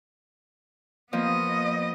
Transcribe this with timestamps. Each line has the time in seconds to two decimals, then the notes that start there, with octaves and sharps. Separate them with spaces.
1.13 F3 A#3 B3 D#5